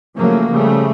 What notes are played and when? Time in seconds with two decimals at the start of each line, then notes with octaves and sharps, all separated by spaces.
0.16 C#3 F3 F#3 A3 A#3
0.50 C#3 F3 G3 A3